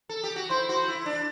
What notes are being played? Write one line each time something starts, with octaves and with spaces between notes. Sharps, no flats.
A4
G4
F#4
E4 C5
F#4
E4
D4